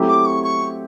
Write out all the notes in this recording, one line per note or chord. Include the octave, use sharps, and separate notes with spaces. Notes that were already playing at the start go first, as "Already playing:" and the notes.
Already playing: F#3 A3 C4 E4 G4
D6
C#6
C#6